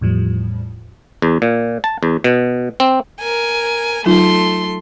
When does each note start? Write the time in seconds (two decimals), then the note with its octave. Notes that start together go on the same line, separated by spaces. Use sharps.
0.01 E2 A2 F3 G3
1.22 E2
1.42 A#2
1.84 A5
2.03 E2
2.24 B2
2.80 C4
3.20 A#4 G#5
4.06 F#3 A3 D#4 F4 C6